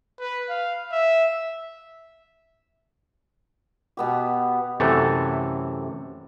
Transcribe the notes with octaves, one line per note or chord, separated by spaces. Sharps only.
B4
F5
E5
B2 B3 G4
F#2 C3 E3 A3 A4